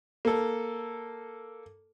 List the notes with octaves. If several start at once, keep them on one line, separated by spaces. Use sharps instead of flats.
A#3 A4